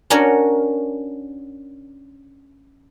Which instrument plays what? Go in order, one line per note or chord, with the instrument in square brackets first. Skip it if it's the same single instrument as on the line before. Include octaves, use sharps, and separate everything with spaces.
[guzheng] C#4 D4 F#4 A#4 C#5